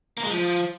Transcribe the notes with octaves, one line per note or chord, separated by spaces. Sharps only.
A#3
G#3
F3